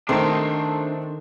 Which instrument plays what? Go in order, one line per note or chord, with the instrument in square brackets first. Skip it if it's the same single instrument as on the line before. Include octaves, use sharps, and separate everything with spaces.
[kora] D#3 D#4 [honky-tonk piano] A3 C4 C6 [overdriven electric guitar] D4 A#5